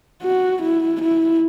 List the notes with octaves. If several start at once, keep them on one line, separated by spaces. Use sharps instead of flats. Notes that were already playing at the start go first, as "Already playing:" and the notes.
F#4
E4
E4